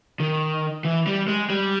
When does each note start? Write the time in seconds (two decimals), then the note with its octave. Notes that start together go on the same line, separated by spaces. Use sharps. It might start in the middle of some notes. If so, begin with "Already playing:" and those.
0.20 D#3
0.85 E3
1.07 G3
1.28 G#3
1.50 G3